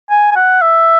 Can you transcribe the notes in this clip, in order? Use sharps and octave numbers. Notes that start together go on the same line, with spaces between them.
G#5
G#5
F#5
E5